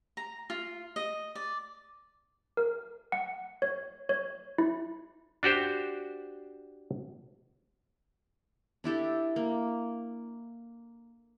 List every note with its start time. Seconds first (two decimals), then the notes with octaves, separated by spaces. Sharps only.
0.17 A#5
0.50 F4
0.96 D#5
1.35 D5
2.57 A#4
3.12 F#5
3.62 C#5
4.09 C#5
4.58 E4
5.43 D4 F#4 G4 C5
8.84 D4 E4 G4 A4
9.36 A#3